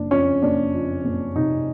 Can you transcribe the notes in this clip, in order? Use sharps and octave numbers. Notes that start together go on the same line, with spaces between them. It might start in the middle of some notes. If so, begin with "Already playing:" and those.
Already playing: F#1 D4
F2 C#4
F#1 D4
F2
F#1
C3 D#4